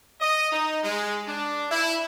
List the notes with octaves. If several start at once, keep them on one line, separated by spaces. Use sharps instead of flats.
D#5
D#4
G#3
D4
E4